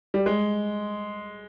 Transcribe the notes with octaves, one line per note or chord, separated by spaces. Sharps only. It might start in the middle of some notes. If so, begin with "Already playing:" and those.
G3
G#3